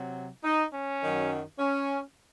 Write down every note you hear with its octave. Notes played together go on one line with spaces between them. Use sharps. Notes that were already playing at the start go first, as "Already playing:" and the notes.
Already playing: C3 F#3
D#4
C#4
F#2 D#3 F#3
C#4